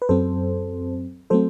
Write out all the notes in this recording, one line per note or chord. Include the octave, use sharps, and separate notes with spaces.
B4
F#2 F#3 C4 A4 C5
F#3 A3 C4 A4 C5